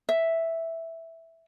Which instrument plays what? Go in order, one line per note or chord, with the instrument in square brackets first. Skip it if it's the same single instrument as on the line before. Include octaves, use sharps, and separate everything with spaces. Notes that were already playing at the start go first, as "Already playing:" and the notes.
[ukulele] E5